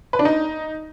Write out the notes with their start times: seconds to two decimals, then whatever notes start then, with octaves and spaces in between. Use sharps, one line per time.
0.13 B4
0.19 D4
0.25 D#4